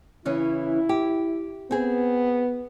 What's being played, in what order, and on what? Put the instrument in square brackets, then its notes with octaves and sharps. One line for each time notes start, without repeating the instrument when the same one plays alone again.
[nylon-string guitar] C#3 E3 C#4 [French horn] E4
[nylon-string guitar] G4
[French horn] B3 [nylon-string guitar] C4 G#4